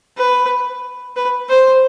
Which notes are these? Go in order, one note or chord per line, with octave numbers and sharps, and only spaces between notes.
B4
B4
C5